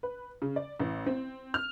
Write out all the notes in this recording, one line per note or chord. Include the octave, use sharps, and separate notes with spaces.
B4
C#3
D5
A1
C4
F6